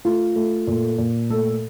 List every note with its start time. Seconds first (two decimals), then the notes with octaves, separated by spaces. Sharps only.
0.05 A3 F4
0.36 A3
0.67 A#2
0.98 A#2
1.30 A3 A4